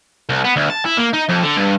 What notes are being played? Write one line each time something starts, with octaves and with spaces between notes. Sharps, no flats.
C2
B3
D2
A5
E4
A#3
D#4
F2
D3
G2